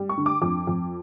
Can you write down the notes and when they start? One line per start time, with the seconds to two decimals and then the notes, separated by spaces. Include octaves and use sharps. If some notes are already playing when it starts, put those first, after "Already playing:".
Already playing: G3
0.09 C#6
0.17 D3
0.26 D6
0.42 F2 D6
0.67 F2